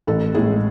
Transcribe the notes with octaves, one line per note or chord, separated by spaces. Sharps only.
A1 A4
A2 G#3 G#4